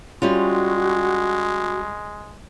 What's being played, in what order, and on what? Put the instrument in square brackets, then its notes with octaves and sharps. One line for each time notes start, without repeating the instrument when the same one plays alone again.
[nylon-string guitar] G3 C#4 F4 [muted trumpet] G#3 [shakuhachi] F#4